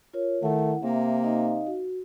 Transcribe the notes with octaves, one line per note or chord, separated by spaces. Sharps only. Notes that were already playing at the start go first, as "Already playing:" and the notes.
F4 A#4 C#5
D#3 A3 E4 F#5
C3 A#3 E5
D#4 D#5 F5
F#4